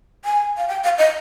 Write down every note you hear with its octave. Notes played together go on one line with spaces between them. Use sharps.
G#5
F5
G5
F5
D#5